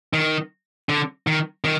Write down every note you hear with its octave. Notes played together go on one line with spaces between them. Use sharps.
D#3
D3
D#3
D#3